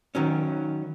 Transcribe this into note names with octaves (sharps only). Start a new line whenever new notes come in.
D#3 F#3 C#4